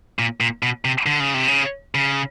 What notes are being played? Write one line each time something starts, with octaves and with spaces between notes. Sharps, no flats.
A#2
A#2
B2
C3
D3
C#3
C3
C#3
C#3